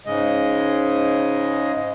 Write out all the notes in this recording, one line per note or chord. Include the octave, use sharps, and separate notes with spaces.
G#2 C#3 G#3 D#5